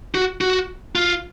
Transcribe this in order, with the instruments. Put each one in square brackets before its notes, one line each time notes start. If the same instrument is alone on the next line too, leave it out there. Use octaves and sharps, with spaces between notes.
[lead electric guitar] F#4
F#4
F4